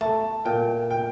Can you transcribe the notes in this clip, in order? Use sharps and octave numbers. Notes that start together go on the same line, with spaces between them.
A3 A5
A#2 G5
G5